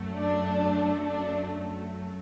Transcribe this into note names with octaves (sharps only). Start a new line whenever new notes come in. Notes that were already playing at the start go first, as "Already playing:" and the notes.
Already playing: F#2 F#3 A3
D4
D4